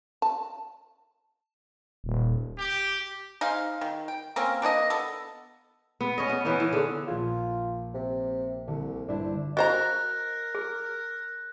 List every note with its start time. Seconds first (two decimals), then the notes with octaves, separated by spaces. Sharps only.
0.22 A5
2.04 D#1
2.58 G4
3.41 D#4 G#4 C5 F5
3.81 D#3
4.08 G5
4.36 A#3 C4 C#4 A#4
4.62 A#3 D4 C#5 D#5
4.90 B3 A4
6.00 B3
6.18 C#4 C#5 D#5
6.29 B3
6.45 E3 B3 C#4 D#4
6.60 E3
6.73 D3 G#4
7.08 A#1 F4 G#6
7.94 C3
8.68 C2 D3
9.08 G2 D4 E4 C5
9.57 F#4 A#4 C5 D#5 A#5 F#6 A#6
10.55 G#4